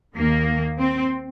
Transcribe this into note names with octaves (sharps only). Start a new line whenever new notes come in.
D#2 D#3 A#3
C4